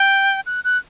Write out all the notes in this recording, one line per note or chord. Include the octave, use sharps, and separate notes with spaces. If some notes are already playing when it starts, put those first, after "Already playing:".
Already playing: G5
F#6
F#6